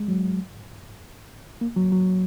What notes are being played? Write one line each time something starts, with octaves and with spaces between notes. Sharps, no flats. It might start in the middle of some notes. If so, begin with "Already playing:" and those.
Already playing: G#3
F#3
A#3
F#3
F#3